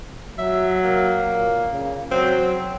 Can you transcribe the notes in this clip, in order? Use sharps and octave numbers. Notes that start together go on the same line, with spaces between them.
F#3 E5
A#3
A#2
C#3
F#3 C4